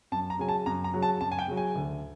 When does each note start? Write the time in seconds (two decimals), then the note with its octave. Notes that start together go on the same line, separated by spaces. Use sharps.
0.12 F#2 A5
0.30 A#5
0.39 C#3 F#3 G#5
0.49 A5
0.66 F#2 A#5
0.84 A#5
0.94 C#3 F#3
1.02 A5
1.21 F#2 A5
1.32 G#5
1.39 G5
1.48 C#3 F#3
1.57 G#5
1.76 D2